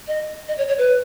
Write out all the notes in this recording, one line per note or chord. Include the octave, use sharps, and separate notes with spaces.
D#5
D#5
C#5
C#5
B4